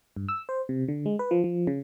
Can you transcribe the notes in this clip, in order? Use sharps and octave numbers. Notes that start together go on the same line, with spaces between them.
G2
E6
C5
C3
D3
G#3
B4
F3
F3
C#3